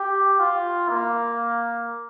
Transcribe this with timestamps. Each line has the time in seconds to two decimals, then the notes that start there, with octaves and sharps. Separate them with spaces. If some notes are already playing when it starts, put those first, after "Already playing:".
Already playing: G4
0.40 F4
0.89 A#3